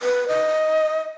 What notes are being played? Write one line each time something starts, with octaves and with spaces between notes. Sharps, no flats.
B4
D#5